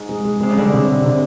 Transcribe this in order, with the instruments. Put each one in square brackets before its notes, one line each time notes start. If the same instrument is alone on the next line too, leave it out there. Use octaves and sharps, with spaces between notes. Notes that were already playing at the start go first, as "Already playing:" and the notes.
Already playing: [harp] G#2
[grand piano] G#3
G#3
[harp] C3 [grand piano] G#3
[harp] C#3
[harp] D3 [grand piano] G3
[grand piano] C3
C3
C3